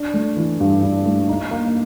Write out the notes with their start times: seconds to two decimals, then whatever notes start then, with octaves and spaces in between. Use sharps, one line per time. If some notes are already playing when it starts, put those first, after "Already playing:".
Already playing: D4
0.14 A3
0.37 E3
0.60 G2
0.82 D4
1.06 A3
1.29 D#4
1.51 A#3